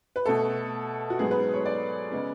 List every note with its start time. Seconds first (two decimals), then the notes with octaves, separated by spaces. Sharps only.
0.16 B4
0.25 B2 A3 A4
1.10 F#4
1.19 G#2 F#3 B3 G#4
1.31 B4
1.54 C#5
1.65 D5
2.12 C#3 G#3 B3